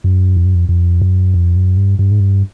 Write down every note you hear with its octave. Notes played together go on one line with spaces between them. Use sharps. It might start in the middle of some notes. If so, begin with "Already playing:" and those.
F#2
F2
F#2
F2
F2
F#2
F2
F#2
G2
G2
G#2
G2